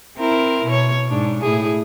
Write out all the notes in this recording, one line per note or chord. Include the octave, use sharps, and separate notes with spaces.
C4 E4 A#4
B2 C#5
G#2 D4
A2 E4 G#4